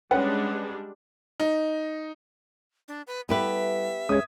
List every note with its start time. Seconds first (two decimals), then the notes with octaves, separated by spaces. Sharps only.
0.11 G3 G#3 C#4 D4 B4 F#5
1.40 D#4
2.88 D4
3.07 B4
3.29 G3 B3 E4 G4 A4 B4 E5
4.09 G#3 C#4 D#6 G#6